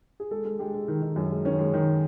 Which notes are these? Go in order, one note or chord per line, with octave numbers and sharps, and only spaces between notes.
G#4
G#3 A4
G#3
G#3 G4
G#3
D#3
D#3
F#2
G#3
D#3 C#4
G#3
D#3